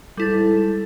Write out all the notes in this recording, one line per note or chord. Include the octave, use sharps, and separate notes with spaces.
G#2 G3 E4 A4 A6